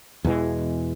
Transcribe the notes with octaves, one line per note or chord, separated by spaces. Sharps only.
E2 B2 E3 G#3